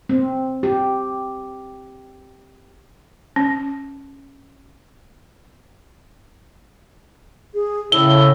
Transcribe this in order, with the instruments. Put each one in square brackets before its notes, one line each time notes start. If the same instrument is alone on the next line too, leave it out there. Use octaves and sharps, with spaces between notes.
[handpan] C4
G4
[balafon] C#4
[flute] G#4
[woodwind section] A2 [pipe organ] C#3 [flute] E6 [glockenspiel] G7